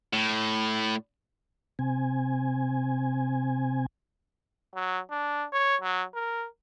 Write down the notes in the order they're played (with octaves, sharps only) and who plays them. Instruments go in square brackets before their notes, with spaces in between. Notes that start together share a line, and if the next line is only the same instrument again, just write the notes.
[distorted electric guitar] A2
[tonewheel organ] C3 C4 G#5
[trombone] F#3
D4
C#5
F#3
A#4